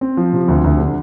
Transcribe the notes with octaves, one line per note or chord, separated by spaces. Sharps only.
C4
F3
C3
D2
D2
D3